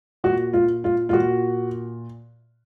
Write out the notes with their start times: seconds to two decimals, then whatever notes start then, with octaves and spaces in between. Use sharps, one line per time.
0.24 A#2 F#4
0.53 F4
0.84 F4
1.09 F4
1.13 A#2 F#4